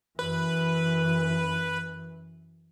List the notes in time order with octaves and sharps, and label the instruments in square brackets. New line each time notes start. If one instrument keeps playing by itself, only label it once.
[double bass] F#2 E3 [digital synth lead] B4